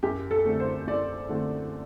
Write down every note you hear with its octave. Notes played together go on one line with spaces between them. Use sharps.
F#2 G4
A4
D3 A3 C4
C5
F#2 D5
D3 A3 C4